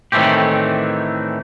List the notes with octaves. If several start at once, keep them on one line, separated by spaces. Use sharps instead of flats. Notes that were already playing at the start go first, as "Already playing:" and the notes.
A2 D#3 E3 A3 C4 G4